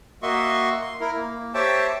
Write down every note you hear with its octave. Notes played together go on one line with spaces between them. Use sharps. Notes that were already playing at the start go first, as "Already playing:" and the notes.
A#3 F#4 D#5 E5 C6 C#6
C6
E4 A#4
A#3
G4 C5 C#5 E5 G5 A5